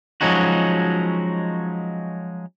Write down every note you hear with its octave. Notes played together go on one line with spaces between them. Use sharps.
F3 F#3 G#3 C#4 D#4 F#4